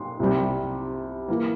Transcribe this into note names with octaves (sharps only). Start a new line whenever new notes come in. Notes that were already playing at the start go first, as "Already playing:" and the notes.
Already playing: C6
C2 C3 G3
E3 A#3